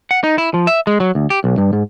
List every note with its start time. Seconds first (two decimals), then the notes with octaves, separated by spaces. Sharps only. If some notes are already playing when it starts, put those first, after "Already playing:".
0.11 F#5
0.24 D#4
0.38 E4
0.54 F3
0.67 E5
0.87 G#3
1.00 F#3
1.15 D2
1.30 G4
1.44 B1
1.58 G2
1.73 G#2